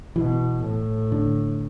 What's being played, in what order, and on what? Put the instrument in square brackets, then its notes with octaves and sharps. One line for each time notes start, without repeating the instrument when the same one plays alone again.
[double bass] B2 [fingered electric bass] E3
[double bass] A2
[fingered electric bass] D3